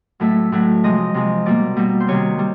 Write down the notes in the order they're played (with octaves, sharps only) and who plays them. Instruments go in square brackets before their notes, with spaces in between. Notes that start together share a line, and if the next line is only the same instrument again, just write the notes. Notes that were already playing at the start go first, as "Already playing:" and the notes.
[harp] A2 F#3 A3 E5
A2 F#3 A3
C3 F3 G#3 D#5
C3 F3 G#3
B2 G3 A#3 D5
B2 G3 A#3
C5
C3 D#3 G3 C#5
G3